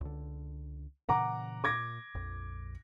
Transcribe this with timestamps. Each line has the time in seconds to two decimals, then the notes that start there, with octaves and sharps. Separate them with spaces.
0.01 C#2 D3
1.09 A#2 C#3 E3 F#5 A#5 D6
1.64 A#2 D6 G#6 A#6
2.15 A#1 F2